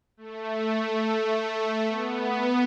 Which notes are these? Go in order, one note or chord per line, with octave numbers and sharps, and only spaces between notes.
A3
B3